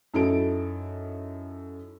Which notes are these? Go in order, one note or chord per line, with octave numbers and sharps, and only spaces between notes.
F#2 D#4 E4 F#4 A4 D7